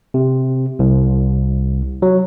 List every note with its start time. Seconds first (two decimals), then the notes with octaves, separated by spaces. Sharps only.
0.14 C3
0.79 C2
2.02 F#3